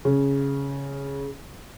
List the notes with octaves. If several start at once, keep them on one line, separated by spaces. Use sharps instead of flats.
C#3